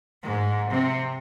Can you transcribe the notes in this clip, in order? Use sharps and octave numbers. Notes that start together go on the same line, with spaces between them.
G#2 G#3
C3 C4